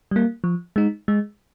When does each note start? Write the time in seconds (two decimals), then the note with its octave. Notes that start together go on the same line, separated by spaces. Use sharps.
0.11 G3 A#3
0.44 F3
0.76 G#3 D#4
1.08 G#3